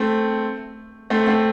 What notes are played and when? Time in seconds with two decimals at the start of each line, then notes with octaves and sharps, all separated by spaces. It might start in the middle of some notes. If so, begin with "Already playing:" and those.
Already playing: A3 C4
1.10 A3 C4
1.27 A3 C4